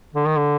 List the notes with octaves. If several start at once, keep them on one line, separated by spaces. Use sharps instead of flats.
D3
D#3
D3